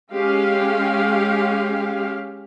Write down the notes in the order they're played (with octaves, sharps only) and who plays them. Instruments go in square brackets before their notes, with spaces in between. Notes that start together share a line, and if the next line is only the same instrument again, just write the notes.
[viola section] G#3 C#4 G4 F5